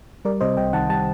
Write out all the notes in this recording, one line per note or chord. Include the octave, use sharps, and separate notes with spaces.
G3 A#4 D5
C3 C5 D#5
C2 D#5 G5
D#3 F#5 A5
G3 F#5 A5